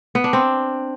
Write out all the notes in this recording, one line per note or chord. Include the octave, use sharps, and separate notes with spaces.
B3
D4
C4